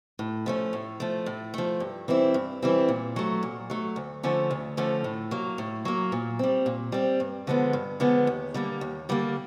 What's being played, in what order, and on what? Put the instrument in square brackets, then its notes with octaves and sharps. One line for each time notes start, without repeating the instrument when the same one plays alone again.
[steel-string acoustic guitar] A2
F3 A3 C#4
A2
F3 A3
A2
F3 A3
G2
E3 G3 C4 E4
G2
E3 G3 C4 E4
A#2
F#3 A3
A#2
F#3 A3
D2
D3 F3 A3 C#4
D2
D3 F3 A3 C#4
A2
F#3 A#3
A2
F#3 A#3
A#2
G3 C4
A#2
G3 C4
G2
D3 F3 G#3 B3
G2
D3 F3 G#3 B3
D#2
D3 G3 A#3
D#2
D3 G3 A#3